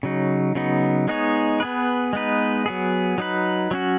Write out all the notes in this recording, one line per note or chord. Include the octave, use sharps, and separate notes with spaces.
C#3 F#3 D#4
C#3 F#3 B3 D#4
G#3 B3 D#4 G#4 C#5
B3 G#4 B4
G#3 B3 D#4 B4
F#3 B3 G#4
F#3 D#4 B4
F#3 C#4 F#4